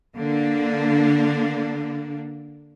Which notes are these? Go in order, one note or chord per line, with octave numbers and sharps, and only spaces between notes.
D3 A#3 D4